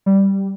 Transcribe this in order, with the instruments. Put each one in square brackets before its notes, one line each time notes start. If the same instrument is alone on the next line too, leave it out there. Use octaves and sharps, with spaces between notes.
[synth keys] G3